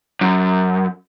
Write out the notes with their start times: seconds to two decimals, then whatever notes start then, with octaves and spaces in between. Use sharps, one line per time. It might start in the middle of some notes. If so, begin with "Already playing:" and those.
0.21 F#2